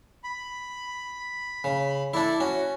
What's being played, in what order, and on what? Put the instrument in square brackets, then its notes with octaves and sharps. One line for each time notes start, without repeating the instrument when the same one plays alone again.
[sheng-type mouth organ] B5
[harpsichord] C#3
[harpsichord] D4 E4 [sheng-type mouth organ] A4 D5 A5
[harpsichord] C#4 [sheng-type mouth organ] F#4